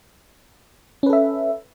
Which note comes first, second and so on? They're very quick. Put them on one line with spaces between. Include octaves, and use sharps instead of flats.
C#4 B4 A4 E5